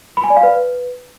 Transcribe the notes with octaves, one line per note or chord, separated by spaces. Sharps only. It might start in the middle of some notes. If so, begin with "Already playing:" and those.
B5
G#5
D5
F5
B4